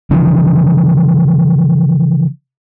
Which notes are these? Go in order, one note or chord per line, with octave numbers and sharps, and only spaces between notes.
C#3 E3 F3 D4